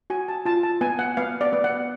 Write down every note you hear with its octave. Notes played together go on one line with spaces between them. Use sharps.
F#4 G#5
A5
F4 A5
A5
B3 G#5
F#5
B3 F5
D5
B3
F#5